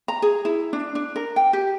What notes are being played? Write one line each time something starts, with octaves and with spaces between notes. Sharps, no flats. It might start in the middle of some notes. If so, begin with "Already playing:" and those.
A#5
G#4
E4
D4
D4
A#4
G5
G4